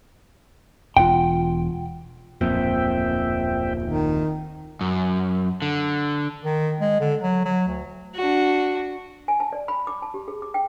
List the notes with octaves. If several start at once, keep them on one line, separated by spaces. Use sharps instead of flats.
E1 F4 F#5 G5
D1 F2 A#2 C4 E5 G5
D#3
F#2
D3
D#3
G#3
D3
F#3
F#3
D2
D4 F#4
G#5
A5
D5
B5
D6
A5
G4
G#4
D6
G5